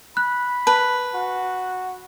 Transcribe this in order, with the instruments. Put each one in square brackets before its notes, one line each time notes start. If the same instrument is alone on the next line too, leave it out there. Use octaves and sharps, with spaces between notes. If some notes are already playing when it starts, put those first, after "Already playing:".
[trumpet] B5 [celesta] F#6
[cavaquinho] B4 [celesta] A5
[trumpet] F#4